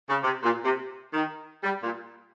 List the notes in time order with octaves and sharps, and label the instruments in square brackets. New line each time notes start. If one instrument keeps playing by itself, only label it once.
[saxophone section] C#3
C3
A#2
C3
D#3
G3
A#2